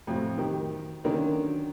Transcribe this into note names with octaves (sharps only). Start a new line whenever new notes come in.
F2 A2 F#3
D#3 G4
D3 D#3 F#3 A#3 C#4 D4